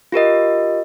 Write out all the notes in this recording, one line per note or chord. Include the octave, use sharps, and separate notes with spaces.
F4 G4 A#4 D#5